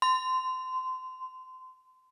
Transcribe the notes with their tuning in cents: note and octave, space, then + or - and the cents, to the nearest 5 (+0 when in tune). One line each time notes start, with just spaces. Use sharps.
C6 -25